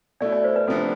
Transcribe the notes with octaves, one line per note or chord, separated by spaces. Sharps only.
B2 A3 E4 D5
D5
C5
B4
D2 C3 F3 B3 D4 A4